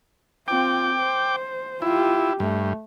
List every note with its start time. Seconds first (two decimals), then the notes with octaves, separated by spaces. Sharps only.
0.48 C4 F4 G5 D6
1.00 C5
1.82 E4 F4 G4
2.40 G2 A3